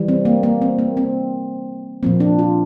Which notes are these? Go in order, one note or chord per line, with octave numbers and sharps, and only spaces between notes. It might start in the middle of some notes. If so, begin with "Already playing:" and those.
Already playing: E3 G3
C4
A#3
A#3
C4
A#3
C4
A#2 F3 A#3 C4
D4
F4